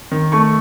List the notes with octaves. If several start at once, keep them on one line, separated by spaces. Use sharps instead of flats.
D#3
A3 C#6